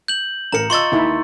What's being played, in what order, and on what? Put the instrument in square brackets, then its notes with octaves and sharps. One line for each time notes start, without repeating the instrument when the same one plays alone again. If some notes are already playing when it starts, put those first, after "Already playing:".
[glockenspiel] G6 F#7
[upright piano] A1 A#4 [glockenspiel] A#5 C#7
[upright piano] F4 D#5 E6 [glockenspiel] C6 C#6 A6
[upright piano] D#2 [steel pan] D#4 E4